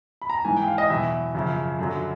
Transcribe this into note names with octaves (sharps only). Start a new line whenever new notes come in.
B5
A#5
A5
G#2 E3 G#5
G5
F5
D#5
E2 B2 F#3 E5
F#2 C#3 F3
F#2 D3 F#3